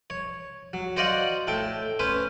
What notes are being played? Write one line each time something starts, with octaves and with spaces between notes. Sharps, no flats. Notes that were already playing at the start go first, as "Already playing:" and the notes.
C#5
F#3
F#4 C5 D5 D#5 F5 F#5
A2 A4 G5
C#4 B4 C5